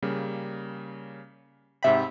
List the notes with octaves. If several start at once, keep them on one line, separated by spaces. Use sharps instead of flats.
C#3 G3 A#3
G#2 C3 E5 G5 B5